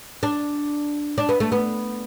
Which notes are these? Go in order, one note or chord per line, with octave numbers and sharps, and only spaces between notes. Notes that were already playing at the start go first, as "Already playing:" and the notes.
D4
D4
B3
A3
B3